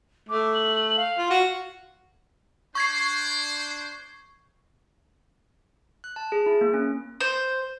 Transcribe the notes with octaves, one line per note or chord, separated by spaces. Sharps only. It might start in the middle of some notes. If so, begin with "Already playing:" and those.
A3 D6
F#7
F5
F4
F#4
D4 C5 C#6 G#6 C7
F#6
A5
G#4
E4
A#3
C#4
C5